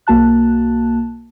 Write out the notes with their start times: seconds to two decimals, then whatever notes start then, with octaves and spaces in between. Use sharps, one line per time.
0.07 B1 A#3 F#4 A5 F#6